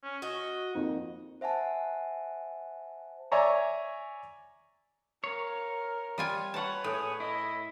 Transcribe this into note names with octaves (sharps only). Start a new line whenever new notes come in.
C#4
F#4 D#5
F2 A#3 D#4
C5 E5 F#5 G#5 A5
C#5 D5 E5 G#5 A#5 C#6
A#4 C#5 F5
G3 F4 G#5
B4 C#5 F#5 A5
A2 G#4
E4 D#5